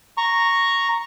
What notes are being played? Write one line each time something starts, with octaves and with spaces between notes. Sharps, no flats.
A#5 C#6